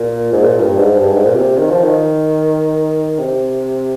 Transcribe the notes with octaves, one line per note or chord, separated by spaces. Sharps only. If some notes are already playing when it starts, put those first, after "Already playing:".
Already playing: A#2
G#2
A#2
G2
G#2
G2
G#2
A#2
C3
D#3
F3
D#3
C3